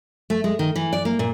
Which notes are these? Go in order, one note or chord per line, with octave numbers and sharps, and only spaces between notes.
A3
G#3
D#3
E3
D5
A#3
A#2